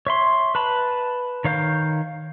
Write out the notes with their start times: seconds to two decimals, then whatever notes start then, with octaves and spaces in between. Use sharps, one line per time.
0.07 C#5 E5 C6
0.55 B4 A5 B5
1.44 D#3 C#5 F5 G6